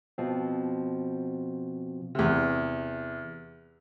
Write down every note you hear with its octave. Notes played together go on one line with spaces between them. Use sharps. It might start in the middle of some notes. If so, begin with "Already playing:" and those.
B2 F3 C4
E2 C3